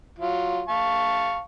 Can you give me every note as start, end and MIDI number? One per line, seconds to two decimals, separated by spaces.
0.19 0.63 54
0.19 0.63 65
0.68 1.41 77
0.68 1.41 81
0.68 1.41 85